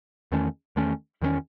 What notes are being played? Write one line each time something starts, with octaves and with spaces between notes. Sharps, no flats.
E2 D#3 A3 C#4
E2 D#3 A3 C#4
E2 D#3 A3 C#4